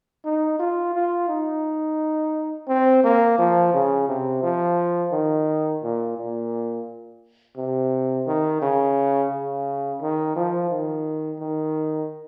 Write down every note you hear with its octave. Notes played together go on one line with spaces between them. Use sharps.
D#4
F4
F4
D#4
C4
A#3
F3
C#3
C3
F3
D#3
A#2
A#2
C3
D#3
C#3
C#3
D#3
F3
D#3
D#3